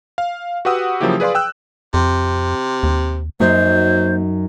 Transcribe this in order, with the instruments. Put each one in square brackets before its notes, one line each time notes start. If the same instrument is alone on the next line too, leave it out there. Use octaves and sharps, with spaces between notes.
[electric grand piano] F5
F#4 G4 B4 F#5 D#6 E6
C#3 F3 F#3 A#3 E4 G4
G#4 B4 D5 F5 C6
G5 E6 F#6
[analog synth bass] F2 [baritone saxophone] C3
[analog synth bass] D#2
[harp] F#2 D#4 [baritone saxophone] F#3 [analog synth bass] A#3 [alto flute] C5